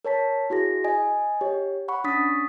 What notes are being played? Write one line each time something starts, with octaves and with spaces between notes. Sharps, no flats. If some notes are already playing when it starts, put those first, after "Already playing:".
A#4 C#5 A5 B6
E4 F#4 G#4 A#6
D#5 G#5
G4 C#5
F#5 B5 C#6
C#4 D4 D#6 A6 B6